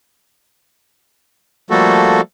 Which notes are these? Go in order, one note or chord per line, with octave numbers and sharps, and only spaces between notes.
F3 G3 A3 A#3 F#4 A4